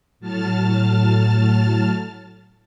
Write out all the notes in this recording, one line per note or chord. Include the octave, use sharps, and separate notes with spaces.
A2 F#3 A5 F6 A6